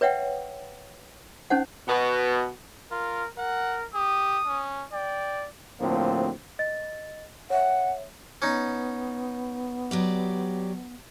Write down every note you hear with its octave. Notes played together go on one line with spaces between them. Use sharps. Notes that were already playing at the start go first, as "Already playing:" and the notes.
B4 C#5 E5 F#5 G5
C#4 D#4 C5 F#5
B2 B3
F4 A#4
A#4 F#5
G4 D#6
C#4
D5 G5
D2 A2 F3 A#3 C4
D#5 A6
C#5 E5 F#5
B3 C#4 D#4
F#3 G4 D5